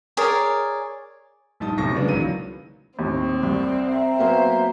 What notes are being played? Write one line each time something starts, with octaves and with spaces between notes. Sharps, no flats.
G#4 A#4 C#5 D5
A#1 G3 D#4 A5 D#6
B1 C3 C#6 A#6
C#3 G3 G#3 A#3 B3 D4
C#2 D#3 E3 F#3 D#7
D#2 A2 C4
C2 D5
E5 G5 A#5
F#3 A#3 B3 C5